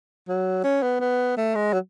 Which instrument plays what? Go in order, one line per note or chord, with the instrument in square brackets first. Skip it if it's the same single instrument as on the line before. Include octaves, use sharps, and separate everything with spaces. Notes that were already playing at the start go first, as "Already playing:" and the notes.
[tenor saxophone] F#3
C#4
B3
B3
A3
G#3
F#3